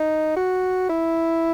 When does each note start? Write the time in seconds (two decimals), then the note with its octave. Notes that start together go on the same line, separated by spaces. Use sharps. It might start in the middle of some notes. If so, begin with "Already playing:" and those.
Already playing: D#4
0.37 F#4
0.89 E4